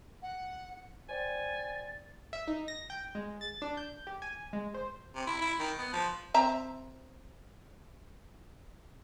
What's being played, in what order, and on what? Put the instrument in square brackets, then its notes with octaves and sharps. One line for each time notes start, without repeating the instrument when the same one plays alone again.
[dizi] F#5
[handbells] C5 D5 G5 [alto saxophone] G#5 [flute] A6
[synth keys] E5
D#4
A#6
G5
G#3
A6
D4
G6
G4
G#5
G#3
C5
[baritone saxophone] C3
E4
E4
D#3
B3
F3
[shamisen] C4 E5 A#5